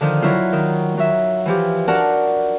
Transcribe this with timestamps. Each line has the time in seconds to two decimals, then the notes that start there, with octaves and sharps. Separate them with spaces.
0.01 D3 D#3 F3
0.22 F#3 E4 F4
0.53 D#3
0.97 F#3 E5
1.46 E3 F3 G4
1.88 D4 F#4 A#4 D5 F#5 A5